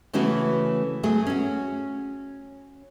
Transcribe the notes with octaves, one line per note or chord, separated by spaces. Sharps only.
C#3 E3 A3 C#4 F#4 B4
F#3 A3 G#4
C#4 F#4